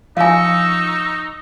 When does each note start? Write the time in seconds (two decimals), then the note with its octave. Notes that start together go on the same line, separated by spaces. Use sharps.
0.17 F3 D#4 F5 G#5 C#6 E6